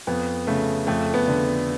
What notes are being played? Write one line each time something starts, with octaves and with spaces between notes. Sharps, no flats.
F2 B3
C#3 A3
F2 A3
B3
D3